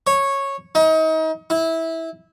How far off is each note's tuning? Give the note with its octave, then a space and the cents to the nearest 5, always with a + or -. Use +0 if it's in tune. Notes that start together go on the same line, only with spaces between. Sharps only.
C#5 -10
D#4 +35
E4 -15